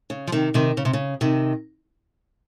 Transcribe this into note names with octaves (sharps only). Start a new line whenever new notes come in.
C#3
F3
C3 D#3
C3 D#3
C#3
C3
C#3
C3 D#3